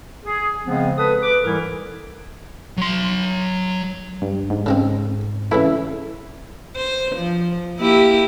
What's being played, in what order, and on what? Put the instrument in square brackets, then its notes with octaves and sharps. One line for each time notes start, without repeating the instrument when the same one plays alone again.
[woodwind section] G#4
C#3 F3 G#3 B3 C4
A4 B4 D#6
B4 D6
G#2 E3 G3 E4 A4 A#4
[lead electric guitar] F#3 C6
[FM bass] G2
G#2
[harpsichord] C#3 G#3 C4
[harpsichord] C#3 E3 A3 [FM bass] E4
[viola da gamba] C5
F3
A#3 E4 G4